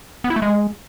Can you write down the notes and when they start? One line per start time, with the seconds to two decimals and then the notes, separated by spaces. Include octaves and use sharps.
0.24 B3
0.30 E4
0.36 A3
0.42 G#3